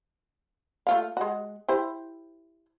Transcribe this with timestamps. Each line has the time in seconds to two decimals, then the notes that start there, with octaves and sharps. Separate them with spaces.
0.87 A3 F4 F5
1.17 G#3 F#4
1.68 E4 G4 C5